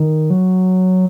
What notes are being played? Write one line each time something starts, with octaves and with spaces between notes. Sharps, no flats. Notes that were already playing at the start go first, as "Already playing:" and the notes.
Already playing: D#3
F#3